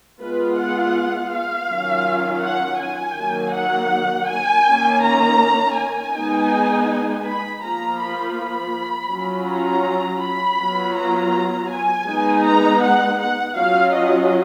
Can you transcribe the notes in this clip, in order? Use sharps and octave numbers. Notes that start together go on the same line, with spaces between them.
G#3 B3 F4 B4
F#5
F5
D#3 F#3 C#4 F4
F#5
G#5
D#3 F#3 A#3
F#5
G#5
D#3 A#3 C#4
A#5
G#5
G#3 B3 D#4
B5
F3 A#3 F4 A#5
B5
B5
F#3 C#4 F4
A#5
B5
F#3 B3 F4
A#5
G#5
G#3 B3 D#4
A#5
F#5
F#5
F#3 C#4 F4 F5
D#5